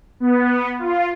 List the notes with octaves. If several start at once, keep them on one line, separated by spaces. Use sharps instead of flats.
B3
F4